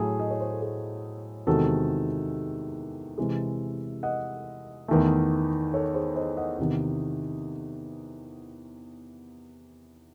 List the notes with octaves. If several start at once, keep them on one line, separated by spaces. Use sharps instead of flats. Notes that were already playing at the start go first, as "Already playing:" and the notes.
Already playing: A2 F#3 A3 G#4
D#5
C#5
C5
A4
G#4
E2 C3 D#3 G#3 F#4 A4
C3 E3 G#3
D#5 F#5
E2 D#3 A3
A4 C#5
G#4 C5
C5 D#5
D#5 F#5
E2 C3 D#3